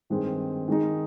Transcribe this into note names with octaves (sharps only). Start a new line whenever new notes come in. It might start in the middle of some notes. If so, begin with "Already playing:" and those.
G2 D#3 G#3 C4
D#3 G#3 D#4